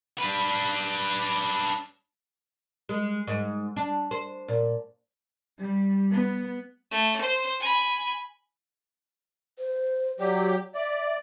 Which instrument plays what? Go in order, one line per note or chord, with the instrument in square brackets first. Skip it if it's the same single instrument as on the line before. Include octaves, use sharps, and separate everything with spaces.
[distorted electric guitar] D4 B4
[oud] G#3
G#2
D4
C5
A#2
[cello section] G3
B3
[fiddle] A3
C5
G#5 B5
[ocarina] C5
[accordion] F#3 G4 [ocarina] D5
[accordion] D5 [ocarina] E5